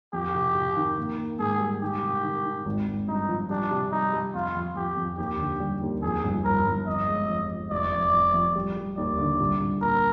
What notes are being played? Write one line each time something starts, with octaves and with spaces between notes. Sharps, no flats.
F2 G4
C3
C3
D#3
A#3
A#3
G#2 G#4
G3
D#3 G4
C3
D#3
D#3
G#1
G#1
G2 D#4
F3
G3 D4
C3
G3 D#4
G3
F2 F4
F2
F2 G4
F2
D#2 G4
D3
G3
D#2
F2 G#4
G1
G1 A#4
G1
F2 D#5
G#3
F2
F2
F1 D5
F1
F1
F2
G3
G3
D#2 D5
D3
C2
C2
A#2 A#4